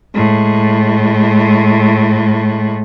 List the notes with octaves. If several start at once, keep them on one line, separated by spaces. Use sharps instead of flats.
A2 G#3